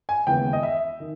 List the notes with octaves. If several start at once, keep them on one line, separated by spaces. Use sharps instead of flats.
G#5
D#2 C#3 E3 G#3 B3 G5
D#5
E5
D#3